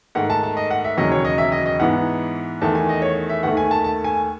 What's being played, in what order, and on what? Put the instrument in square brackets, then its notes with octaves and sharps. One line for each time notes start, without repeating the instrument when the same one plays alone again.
[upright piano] G#2 D#3 A3 F#5
A5
A5
D#5
F#5
E5
E1 D#2 C#3 F#3 D#5
C#5
D#5
E5
D#5
D#5
G#2 E3 B3 F#5
E2 D#3 A3 A5
G#5
D#5
C#5
E5
D#2 D#3 A3 F#5
G#5
A5
A5
G#5